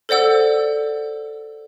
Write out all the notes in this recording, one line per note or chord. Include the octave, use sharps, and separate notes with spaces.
A4 C5 D5 F#5 E6